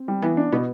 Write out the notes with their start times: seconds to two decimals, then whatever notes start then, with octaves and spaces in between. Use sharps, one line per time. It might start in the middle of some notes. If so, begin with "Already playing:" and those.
Already playing: C4
0.08 G3
0.22 E3 B3
0.37 D4
0.52 B2 B3